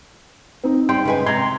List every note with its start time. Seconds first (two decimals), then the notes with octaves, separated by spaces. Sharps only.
0.64 C4 D#4
0.89 G3 G5 C6
1.05 F#2 C#3 G#3 B4 G#5
1.26 C3 A#5 C6 G#6